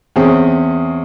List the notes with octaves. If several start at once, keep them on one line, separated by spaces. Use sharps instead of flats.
E2 C4 C#4 G#4